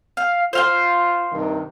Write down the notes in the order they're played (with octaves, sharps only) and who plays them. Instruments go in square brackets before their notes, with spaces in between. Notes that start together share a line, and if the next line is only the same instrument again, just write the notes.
[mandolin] F5
[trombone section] F4 [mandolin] C5 F5 C6
[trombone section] G2 C3 D#3